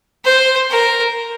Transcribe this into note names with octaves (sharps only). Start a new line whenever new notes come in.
C5
A#4